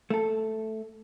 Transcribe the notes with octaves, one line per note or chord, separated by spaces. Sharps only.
A3 A4